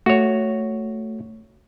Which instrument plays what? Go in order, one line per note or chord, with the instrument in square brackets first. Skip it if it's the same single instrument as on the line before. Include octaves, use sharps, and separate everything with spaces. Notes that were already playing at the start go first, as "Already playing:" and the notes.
[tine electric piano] A3 [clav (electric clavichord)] F#4 C#5